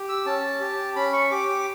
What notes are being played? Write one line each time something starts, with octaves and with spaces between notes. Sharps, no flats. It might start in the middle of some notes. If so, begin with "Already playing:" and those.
Already playing: G4
E6
C#4 A5
G4
C#4 B5
C#6
G4 D6
D6